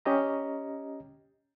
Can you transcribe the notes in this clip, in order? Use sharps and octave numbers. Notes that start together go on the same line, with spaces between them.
C#4 G4 D#5 A#5